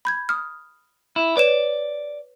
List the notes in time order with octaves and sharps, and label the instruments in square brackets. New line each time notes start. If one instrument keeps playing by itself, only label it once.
[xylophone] B5 G6 G#6
D#6 F6
[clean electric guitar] E4
[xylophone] B4 C#5 E7 [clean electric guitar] D5